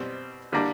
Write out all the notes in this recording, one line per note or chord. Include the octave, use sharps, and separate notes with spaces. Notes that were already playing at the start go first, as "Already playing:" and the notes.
Already playing: B2 G3 C4
D3 G3 A#3 D4